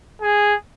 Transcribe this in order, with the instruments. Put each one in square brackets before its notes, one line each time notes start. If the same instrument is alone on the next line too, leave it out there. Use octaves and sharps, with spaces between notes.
[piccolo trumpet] G#4